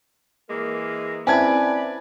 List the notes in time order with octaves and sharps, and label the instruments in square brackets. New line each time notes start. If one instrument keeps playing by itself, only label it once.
[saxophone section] E3 G#3 A#3
[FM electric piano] C4 C#4 E4 [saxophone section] B4 D5 [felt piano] G#5 A5 G#6